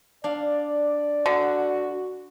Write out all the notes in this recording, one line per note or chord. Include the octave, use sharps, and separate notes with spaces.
D4 D5 F5
D3 F#4